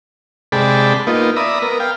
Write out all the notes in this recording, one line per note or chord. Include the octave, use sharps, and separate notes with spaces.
C3 G#3 D5 G5 A5 B5
A#3 B3 D#4 F4
D5 E5 A#5 B5 D#6
B3 A#4
F5 G5